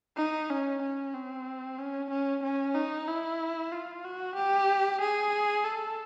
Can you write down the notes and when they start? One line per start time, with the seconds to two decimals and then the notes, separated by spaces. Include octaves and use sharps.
0.17 D#4
0.50 C#4
0.82 C#4
1.13 C4
1.78 C#4
2.10 C#4
2.43 C#4
2.74 D#4
3.08 E4
3.72 F4
4.05 F#4
4.36 G4
5.01 G#4
5.64 A4